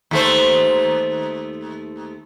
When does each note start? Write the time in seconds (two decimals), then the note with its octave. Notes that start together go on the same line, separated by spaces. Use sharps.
0.11 D#2 A3 C5